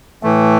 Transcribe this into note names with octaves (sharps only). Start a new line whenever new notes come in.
A2 E3 A3